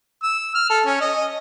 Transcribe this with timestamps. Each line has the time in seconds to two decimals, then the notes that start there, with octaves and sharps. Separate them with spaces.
0.22 E6
0.55 F6
0.69 A4
0.86 C#4
1.00 D#5